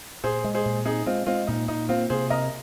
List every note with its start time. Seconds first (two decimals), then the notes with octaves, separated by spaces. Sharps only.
0.24 A#2 G#4 C5
0.44 G#3
0.55 G#4 C5
0.66 A#2
0.86 C4 D#4 G#4
1.06 G#3 C4 F4
1.26 G#3 C4 F4
1.47 A#2 D#4
1.68 A#2 D#4
1.89 A#3 C4 F4
2.10 C3 G#4 C5
2.30 C3 A#4 D#5